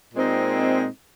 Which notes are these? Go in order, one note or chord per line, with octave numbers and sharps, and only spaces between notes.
A#2 G#3 C4 D#4